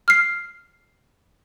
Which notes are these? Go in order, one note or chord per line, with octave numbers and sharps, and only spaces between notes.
F6 C7